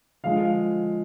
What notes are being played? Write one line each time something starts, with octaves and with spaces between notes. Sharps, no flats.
D3 F3 G#3 F5